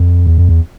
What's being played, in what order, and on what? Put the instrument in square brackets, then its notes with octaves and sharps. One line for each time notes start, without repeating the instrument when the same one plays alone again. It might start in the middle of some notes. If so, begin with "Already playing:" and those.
Already playing: [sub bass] F2
E2
F2
E2